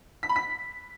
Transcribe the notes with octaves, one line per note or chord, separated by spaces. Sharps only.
B6
B5
B6